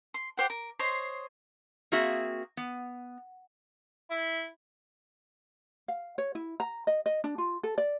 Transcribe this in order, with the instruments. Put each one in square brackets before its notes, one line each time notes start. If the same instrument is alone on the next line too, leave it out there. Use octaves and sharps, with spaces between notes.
[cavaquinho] C6
G4 C5 F#5
A#4
C5 C#5 D#5 C6
[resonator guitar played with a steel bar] A#3 C4 F#4 G#4 E5 F5
B3
[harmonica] E4
[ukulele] F5
C#5
E4
A#5
D#5
D#5
D4
F4
A4
D5